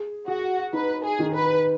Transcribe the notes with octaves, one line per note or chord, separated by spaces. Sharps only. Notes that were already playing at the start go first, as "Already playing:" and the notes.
Already playing: G#4
F#4 G#4
D#4 B4
G#4
D#3
B4